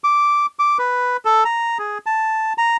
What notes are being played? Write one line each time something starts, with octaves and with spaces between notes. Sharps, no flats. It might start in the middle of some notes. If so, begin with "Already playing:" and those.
D6
D6
B4
A4
A#5
G#4
A5
A#5